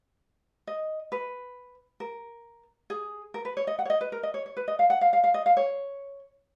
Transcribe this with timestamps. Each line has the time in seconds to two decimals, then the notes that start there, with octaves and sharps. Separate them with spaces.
0.67 D#5
1.12 B4
2.00 A#4
2.90 G#4
3.34 A#4
3.45 B4
3.57 C#5
3.67 D#5
3.79 F#5
3.85 C#5
3.90 D#5
4.01 B4
4.12 A#4
4.23 D#5
4.34 C#5
4.46 C#5
4.57 B4
4.68 D#5
4.79 F5
4.90 F#5
5.01 F5
5.13 F5
5.24 F5
5.34 D#5
5.46 F5
5.57 C#5